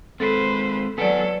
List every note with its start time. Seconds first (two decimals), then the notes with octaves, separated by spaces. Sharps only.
0.20 G#3 C4 A4 B4 C5
0.98 F#3 B3 A4 B4 D5 F#5 G#5